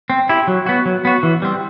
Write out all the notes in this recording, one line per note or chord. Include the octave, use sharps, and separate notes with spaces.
C4
E4 G4
F#3
B3 F#4
F#3
B3 F#4
E3
G3 C4